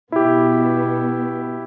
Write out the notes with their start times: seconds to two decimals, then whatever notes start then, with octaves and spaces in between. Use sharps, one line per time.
0.12 B2 B3 E4 G4